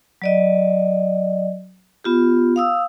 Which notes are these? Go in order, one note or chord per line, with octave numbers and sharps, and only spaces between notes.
F#3 D5 D#5
B3 F4 G4
F5 D#6 E6